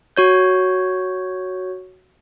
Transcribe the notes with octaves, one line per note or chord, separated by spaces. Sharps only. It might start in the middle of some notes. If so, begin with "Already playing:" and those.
F#4 C#5 G6